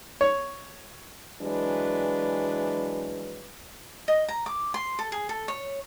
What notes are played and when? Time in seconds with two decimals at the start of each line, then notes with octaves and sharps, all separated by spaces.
0.21 C#5
1.41 E3 F#3 G#3 D4 B4
4.08 D#5
4.28 A#5
4.46 D6
4.74 C6
4.99 A4
5.12 G#4
5.29 A4
5.48 C#5